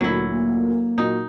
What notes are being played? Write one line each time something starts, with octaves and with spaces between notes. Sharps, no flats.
D2 A#2 F#3 E4
A#3
A#2 F#3 D#4